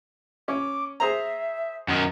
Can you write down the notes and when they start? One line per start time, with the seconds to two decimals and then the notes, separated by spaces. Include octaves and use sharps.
0.48 C#4 D6
1.00 G#4 C5 E5 A#5
1.88 F#2 D#3